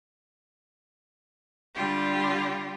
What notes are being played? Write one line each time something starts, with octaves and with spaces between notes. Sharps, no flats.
D3 G3 F4 G4